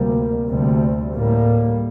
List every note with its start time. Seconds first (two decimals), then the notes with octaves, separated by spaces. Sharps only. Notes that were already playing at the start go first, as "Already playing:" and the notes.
Already playing: D2 C3 G3 A#3
0.48 D2 C3 G3
1.14 A2 G3 A#3